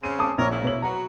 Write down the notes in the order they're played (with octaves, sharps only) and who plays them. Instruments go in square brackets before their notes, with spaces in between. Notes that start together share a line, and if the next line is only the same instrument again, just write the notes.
[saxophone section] C#3 C4 C#4 [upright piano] D#7
[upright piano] A5 D6 D#6
[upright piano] A#1 [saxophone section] A#4 C#5
[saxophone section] A#2 C#3 E4
[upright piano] B2 C#5 F#7
[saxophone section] F#3 B3 F#4 [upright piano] A#5